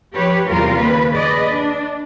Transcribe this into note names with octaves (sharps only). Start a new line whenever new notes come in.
F3 G4 B4 C#5
E2 C3 G3 F4 A#4
D#2 C#3 B4
G#4 B4 D5 D#5
D4